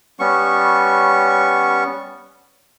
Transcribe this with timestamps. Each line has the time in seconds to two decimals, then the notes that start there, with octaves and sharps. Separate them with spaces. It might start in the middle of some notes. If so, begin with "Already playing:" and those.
0.19 G3 B3 C#4 C#6